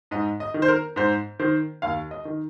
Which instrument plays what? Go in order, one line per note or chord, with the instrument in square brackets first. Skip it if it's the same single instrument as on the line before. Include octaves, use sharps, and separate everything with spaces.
[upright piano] G#2 D#5
D#5
D#3
C5
A#4
G#2 C5
D#3 C5
D#2 F5
D#5
D#3